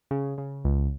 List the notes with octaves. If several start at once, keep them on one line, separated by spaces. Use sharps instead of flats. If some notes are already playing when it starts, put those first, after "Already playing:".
C#3
C#3
C#2